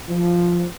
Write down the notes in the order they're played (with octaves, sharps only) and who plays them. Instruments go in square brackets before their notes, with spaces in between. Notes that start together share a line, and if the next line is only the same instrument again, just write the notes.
[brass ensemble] F3